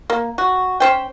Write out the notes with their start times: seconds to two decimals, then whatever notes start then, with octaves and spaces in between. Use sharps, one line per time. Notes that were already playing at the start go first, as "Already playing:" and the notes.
0.10 A#3
0.38 F#4
0.80 C#4 C5 G5